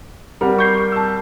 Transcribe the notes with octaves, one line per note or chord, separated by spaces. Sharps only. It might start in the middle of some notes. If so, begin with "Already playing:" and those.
G3 C4 A#4 F#5
C#6 G6 C7
A5 E6